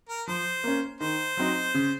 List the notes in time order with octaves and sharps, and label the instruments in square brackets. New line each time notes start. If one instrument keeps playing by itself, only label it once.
[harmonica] A#4
[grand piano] F3 [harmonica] C5
[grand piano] A#3 C#4
[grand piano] D#3 [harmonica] C5
[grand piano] F#3 C4 D#4
C#3